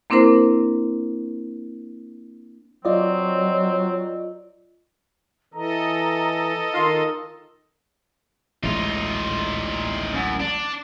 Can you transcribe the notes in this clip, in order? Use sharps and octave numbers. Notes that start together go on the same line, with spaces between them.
A#3 C4 D4 E4 A#4 C5
F#3 C4 F4 D5 D#5
E3 A4 D#5 A#5
D#3 D#4 F4
A1 D2 G#3 D#4 F4
F#2
D4